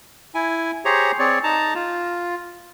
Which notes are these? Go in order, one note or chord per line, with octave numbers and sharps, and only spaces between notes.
E4 G#5
G4 G#4 C5 C#5 A#5
C4 G#4 C#5 D5
D#4 A5 A#5
F4